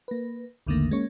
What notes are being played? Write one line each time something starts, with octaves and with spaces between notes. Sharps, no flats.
A#3 B4
A#1 E2 D3 D#3 A3 A#3
G#3 A#3 C#4 C#5